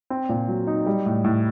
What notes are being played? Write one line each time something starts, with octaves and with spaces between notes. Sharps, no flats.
C4
A#2
F#3
D#4
G3
A2
A2